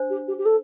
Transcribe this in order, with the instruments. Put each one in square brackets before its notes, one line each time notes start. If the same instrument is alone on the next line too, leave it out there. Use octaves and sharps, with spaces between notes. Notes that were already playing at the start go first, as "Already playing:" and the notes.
Already playing: [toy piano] D4 C5
[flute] G4
G4
G4
A4